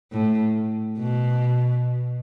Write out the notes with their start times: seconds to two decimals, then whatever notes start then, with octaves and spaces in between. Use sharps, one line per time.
0.13 A2
0.98 B2